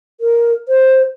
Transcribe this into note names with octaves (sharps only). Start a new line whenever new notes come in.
A#4
C5